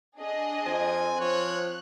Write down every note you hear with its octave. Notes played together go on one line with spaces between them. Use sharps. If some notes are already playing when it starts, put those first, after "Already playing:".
D4 G#4 D#5
F2 C4 G#5
F3 C#5 F#6